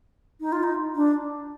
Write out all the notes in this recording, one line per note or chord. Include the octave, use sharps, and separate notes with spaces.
D#4
F4
D#4
D4